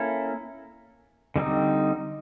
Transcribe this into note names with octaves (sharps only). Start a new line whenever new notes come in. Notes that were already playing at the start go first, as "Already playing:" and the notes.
Already playing: A#3 C#4 E4 A4
D3 G3 C4 D#4